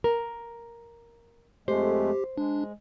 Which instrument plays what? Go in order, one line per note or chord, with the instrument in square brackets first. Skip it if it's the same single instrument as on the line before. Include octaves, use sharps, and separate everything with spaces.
[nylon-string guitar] A#4
[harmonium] F2 G#3 A3 [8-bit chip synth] G4 [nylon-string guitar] C5
[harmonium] G#3 [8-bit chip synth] D4